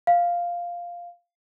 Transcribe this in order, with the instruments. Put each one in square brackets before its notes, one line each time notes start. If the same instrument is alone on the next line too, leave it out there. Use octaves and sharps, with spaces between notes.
[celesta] F5